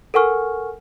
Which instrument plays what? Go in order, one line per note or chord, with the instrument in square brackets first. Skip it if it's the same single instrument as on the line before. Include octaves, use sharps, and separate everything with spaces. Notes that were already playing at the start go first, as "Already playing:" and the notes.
[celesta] A4 A#4 F#5 G#5 C#6 F6